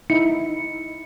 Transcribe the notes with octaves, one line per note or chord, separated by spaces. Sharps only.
D#4 E4 C#7